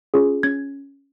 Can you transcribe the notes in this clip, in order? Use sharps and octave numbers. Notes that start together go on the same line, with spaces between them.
C#4 F4 G#4
C#4 G#6